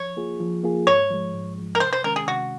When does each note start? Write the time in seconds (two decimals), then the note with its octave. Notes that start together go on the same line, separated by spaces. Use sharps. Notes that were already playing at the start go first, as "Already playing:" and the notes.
Already playing: F3 C#5
0.17 A#3 F4 G#4
0.40 F3
0.64 A#3 F4 G#4
0.87 G#2 C#5
1.10 F3 G#3
1.34 G#2
1.57 F3 G#3
1.75 A#4
1.80 C3 C5
1.93 C5
2.04 D#3 G#3 C#4 A#4
2.16 G#4
2.27 C3 F#4